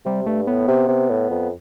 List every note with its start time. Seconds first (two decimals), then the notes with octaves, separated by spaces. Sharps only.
0.05 C3 G3
0.26 G2 A3
0.47 A2 B3
0.68 C3
0.88 C3
1.09 A2
1.30 F2